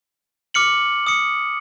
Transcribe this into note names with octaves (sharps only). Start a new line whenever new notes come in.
D6 F6 C#7 F#7
D#6 C#7